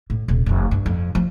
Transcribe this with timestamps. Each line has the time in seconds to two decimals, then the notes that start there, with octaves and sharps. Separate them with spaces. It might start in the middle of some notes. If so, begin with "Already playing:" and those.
0.10 A2
0.28 D#1 C3
0.46 F1 D#3
0.71 G2
0.86 F2
1.15 F3 G3